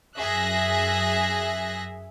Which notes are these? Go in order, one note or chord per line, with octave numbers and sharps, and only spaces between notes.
F#2 G#4 E5 F#6 A#6